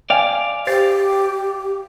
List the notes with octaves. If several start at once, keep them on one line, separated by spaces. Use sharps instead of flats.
D5 F5 G5 G#5
G4 C5 A6 C7